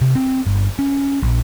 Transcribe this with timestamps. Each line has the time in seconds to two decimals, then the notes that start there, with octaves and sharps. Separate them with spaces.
0.01 C3
0.15 C4
0.47 G1
0.79 C#4
1.23 A#1